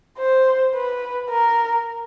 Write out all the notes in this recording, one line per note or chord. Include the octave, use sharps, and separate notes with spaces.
C5
B4
A#4